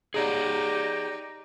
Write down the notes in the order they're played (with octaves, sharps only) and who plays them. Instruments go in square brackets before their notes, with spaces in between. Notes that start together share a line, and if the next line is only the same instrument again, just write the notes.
[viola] D#4 G4 [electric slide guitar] G#4 C#5 D5